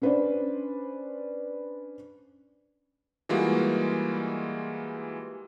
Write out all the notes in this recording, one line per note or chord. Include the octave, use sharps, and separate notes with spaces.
C#4 D4 B4 C5 D5
E3 G3 G#3 A#3 F4 F#4